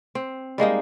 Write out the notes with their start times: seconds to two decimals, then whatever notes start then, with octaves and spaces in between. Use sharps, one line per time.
0.15 C4
0.58 G3 G#3 A#3 D#4